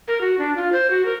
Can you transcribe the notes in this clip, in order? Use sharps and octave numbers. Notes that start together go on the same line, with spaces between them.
A#4
F#4
D4
F4
C5
F#4
A#4